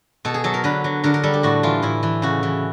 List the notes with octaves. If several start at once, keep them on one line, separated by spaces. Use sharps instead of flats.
B2 A4
G#4
F#3 A4
A#4
D3 B4
F#3
D3 A#4
A#4
G3 A4
G4
A2 F#4
E3 F4
A2 E4
E3
C#3 F#4
E3